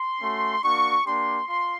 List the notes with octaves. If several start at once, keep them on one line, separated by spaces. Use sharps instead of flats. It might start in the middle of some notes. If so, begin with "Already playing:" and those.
Already playing: C6
A3 C#4 F#4
A#3 D4 F#4 C#6
A#3 D4 G4 C6
F4 C6